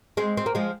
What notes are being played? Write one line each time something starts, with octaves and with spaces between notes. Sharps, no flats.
G#3 C4
C4
A#3
F3 G#3